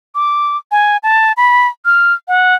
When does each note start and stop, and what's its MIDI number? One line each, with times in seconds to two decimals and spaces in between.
0.15 0.57 86
0.71 0.97 80
1.03 1.32 81
1.37 1.67 83
1.85 2.13 89
2.28 2.55 78